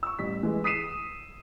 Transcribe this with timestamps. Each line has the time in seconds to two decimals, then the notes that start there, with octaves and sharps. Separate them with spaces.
0.03 C#6 E6
0.19 A1 G3 B6
0.43 E3 G#3
0.64 D#6 B6 C7 D#7 E7